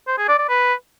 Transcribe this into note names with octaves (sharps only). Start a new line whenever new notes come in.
C5
G#4
D5
D5
B4